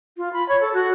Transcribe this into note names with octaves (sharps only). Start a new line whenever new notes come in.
F4
B5
C#5
A4
F#4